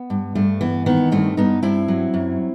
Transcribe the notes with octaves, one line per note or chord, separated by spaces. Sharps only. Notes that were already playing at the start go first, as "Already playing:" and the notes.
Already playing: B3
G2
G2 A3
E3 B3
D#3 B3
G2 A3 C4
G2 B3 D#4
G2 C4 E4
F#3
F#2